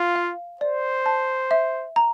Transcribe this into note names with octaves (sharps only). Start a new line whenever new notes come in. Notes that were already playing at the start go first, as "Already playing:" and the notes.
Already playing: F4
F5
C5 D5
A5
E5
A#5